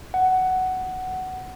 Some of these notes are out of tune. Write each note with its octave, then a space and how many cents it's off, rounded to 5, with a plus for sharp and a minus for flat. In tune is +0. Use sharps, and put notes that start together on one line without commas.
F#5 +10